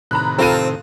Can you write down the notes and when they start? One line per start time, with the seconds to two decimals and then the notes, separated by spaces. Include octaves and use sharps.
0.11 A2 C3 D#3 A#5 B5 F#6
0.38 C4 F4 A4 D#7